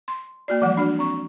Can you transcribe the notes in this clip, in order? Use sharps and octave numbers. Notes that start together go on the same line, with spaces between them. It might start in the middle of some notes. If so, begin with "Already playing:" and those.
C6
A#3 F#4 D5
E3 F3 G3 G#3
D4 F#4
C4 C#6